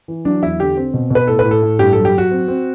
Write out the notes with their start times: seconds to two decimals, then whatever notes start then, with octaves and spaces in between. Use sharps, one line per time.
0.08 E3
0.25 F#3 D4
0.42 E2 E4
0.60 D3 G4
0.77 C4
0.94 B2
1.11 B2 B4
1.27 A2 A4
1.39 B4
1.45 A2
1.51 A4
1.63 A2
1.79 G2 G4
1.93 F#3 A4
2.05 G4
2.15 F#3 F#4
2.31 C4
2.48 C4